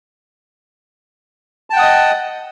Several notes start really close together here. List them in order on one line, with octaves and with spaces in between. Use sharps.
A5 G5 F#5 D#6 D#5